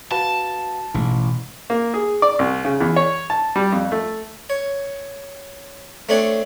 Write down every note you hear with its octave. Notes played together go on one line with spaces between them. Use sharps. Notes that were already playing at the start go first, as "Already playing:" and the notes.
F#4 B4 F5 A5
A1 G#2 B2
A#3
G#4
D5
C2
C#3
E2
C#5
A5
G3
F2
A3
C#5
A3 C4 D4 C#5